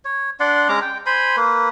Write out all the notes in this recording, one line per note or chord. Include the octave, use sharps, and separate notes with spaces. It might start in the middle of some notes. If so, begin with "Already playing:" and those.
C#5
D4 D5 F#5 C6
G#3 C#4 A#5 D6
G5
C5 G#5 B5 C6
A#3 B4